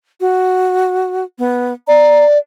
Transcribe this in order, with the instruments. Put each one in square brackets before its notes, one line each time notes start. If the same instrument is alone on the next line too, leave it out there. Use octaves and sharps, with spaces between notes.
[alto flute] F#4
B3
[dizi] D5 [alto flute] A#5